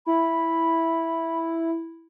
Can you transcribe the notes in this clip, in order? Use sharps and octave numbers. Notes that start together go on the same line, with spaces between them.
E4 B5